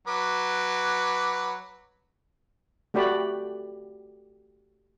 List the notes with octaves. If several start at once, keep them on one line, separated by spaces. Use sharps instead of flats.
F#3 B4 D6
A3 F#4 G4 D5 B5